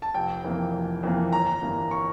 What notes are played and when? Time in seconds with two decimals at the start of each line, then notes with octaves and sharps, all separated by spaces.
0.02 A5
0.14 F1 G5
0.44 F2 E3 A#3
0.73 F1
1.03 F2 E3 A#3
1.32 G1 A#5
1.62 G2 E3 A#3
1.91 C#6